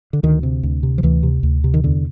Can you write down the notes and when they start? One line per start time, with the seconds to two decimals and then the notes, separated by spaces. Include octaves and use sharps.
0.13 D3
0.23 D2 D#3
0.43 C3
0.63 D2
0.83 C3
0.98 F3
1.03 D2 E3
1.23 C3
1.43 D2
1.64 C3
1.74 D#3
1.83 E2 D3